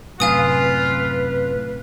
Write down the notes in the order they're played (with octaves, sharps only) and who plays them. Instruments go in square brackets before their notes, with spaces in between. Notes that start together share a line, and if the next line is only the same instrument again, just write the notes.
[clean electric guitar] F#2 A2 C3 [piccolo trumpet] F4 [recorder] B4 [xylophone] F5 G#5 D#6